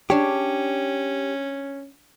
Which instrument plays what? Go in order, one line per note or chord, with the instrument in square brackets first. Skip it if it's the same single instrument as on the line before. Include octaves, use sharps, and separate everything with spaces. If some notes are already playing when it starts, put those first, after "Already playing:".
[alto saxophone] C#4 [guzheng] D4 C#5 [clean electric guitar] G4